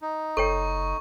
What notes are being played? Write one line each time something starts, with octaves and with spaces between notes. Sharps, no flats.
D#4
F#1 A4 C#5 G5 C#6